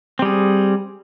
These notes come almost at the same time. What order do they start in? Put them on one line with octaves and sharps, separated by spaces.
C4 G3 G#4